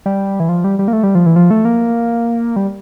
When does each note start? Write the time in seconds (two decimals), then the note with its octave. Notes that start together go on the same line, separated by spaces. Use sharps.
0.06 G3
0.40 E3
0.49 F3
0.64 G3
0.79 G3
0.88 A#3
0.93 A3
1.03 G3
1.15 F3
1.26 E3
1.36 F3
1.51 A3
1.65 A#3
2.56 G3